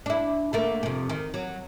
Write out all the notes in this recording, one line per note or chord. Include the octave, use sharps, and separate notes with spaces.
D4 E4
D3 A3 A#3
F2 C3
D#3
F#3